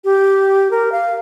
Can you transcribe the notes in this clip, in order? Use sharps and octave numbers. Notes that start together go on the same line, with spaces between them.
G4
A#4
F5